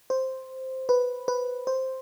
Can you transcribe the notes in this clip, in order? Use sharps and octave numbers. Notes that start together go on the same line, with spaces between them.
C5
B4
B4
C5